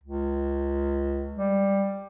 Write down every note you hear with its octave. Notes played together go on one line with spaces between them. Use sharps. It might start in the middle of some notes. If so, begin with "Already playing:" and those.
C#2
G3